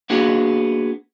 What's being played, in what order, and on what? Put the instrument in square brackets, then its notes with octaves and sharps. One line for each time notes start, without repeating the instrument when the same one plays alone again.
[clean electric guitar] A#3 B3 D4 F#4 G#4